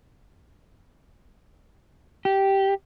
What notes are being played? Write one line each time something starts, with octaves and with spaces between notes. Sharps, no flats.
G4